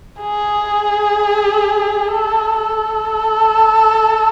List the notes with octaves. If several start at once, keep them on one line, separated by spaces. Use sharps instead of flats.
G#4
A4
A4